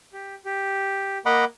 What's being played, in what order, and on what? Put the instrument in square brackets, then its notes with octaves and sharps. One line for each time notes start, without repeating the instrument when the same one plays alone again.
[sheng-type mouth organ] G4
G4
[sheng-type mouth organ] A#3 A#5 D6 [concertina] D#5 F#5 B5